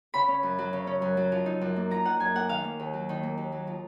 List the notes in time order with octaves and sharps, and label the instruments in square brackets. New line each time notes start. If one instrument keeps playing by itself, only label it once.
[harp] C#3 B5
C#4
F#2
F#3
C#3
C#4
F#2
F#3
F3
D#4
F#2
A#3
F3 A#5
D#4 F#5
F#2 G#5
A#3 F#5
D#3 F5
A#3
D#2
F#3
D#3
A#3
D#2
F#3
F3